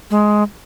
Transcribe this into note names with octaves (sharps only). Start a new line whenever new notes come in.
G#3